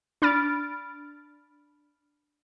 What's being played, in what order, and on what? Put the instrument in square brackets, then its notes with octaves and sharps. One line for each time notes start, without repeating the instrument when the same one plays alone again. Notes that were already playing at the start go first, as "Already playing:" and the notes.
[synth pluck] D4 B5 F6 A6 D7